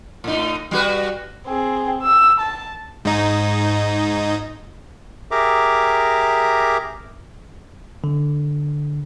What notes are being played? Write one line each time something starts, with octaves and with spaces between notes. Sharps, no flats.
A2 D#4
G3 F#4 B4
C4 G#4
E6
A5
G#2 D#4
G4 G#4 A#4 E5 A#5 D6
D3